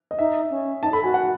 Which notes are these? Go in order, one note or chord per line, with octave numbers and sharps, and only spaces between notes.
D#5
D#4 E5
C#4
D#4 A5
A4 B5
F#4 G#5
F#5